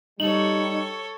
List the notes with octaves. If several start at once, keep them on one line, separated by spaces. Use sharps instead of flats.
G3 D#4 A4 C#5 F#7